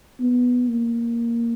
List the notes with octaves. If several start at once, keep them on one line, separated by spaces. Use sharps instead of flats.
B3
A#3